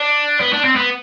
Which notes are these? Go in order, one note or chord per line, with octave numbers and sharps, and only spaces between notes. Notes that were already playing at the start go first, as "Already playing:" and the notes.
Already playing: D4
B3
D4
C4
B3